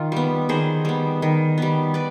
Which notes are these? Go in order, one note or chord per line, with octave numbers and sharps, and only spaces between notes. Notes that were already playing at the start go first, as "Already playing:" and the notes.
Already playing: D#3 F4
G3 B3
D#3 G#4 C5
G3 B3
D#3
G3 B3
B4 D5